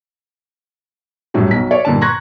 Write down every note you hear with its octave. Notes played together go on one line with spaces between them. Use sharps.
F#2 A2 F#3 G3
B1 F#3 B6
C#5 D5
G2 A#2 D3 D#4 A5
A#5 C6 C#6 F#6 G#6 A#6